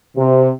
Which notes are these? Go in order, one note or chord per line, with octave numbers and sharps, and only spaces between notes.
C3